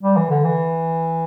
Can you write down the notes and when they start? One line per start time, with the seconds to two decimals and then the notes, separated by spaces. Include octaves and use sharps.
0.03 G3
0.17 E3
0.30 D3
0.44 E3